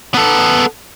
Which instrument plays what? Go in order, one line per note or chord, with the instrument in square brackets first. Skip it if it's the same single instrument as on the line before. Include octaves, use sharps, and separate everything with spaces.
[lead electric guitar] B3 A4